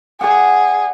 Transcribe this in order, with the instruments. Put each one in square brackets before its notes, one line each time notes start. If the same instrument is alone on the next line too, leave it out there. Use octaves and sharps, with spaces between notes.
[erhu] G#4 [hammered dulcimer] D5 F#5